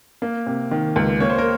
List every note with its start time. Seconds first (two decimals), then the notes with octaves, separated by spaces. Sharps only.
0.22 A#3
0.47 C3
0.71 D#3
0.96 C#2
1.20 A#3 C#5
1.30 C5
1.38 A#4